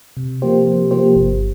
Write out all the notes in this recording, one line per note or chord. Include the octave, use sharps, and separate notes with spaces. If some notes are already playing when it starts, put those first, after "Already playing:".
C3
F3 A#3 G4 C5
C3
F3 A#3 G4 C5
G1